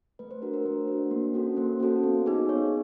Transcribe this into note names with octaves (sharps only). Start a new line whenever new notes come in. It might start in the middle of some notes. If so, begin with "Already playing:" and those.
A3 B4
C5
D4 F#4 A#4
A#4
A3 C5
D4 F#4
A#3
C#4 F#4 A4
A#3 C5
C#4 F#4 A4
B3
D#4 G#4
B3 C#5